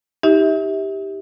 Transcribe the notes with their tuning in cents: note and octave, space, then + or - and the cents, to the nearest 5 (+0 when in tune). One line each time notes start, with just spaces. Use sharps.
D#4 +30 G4 +0 E5 -35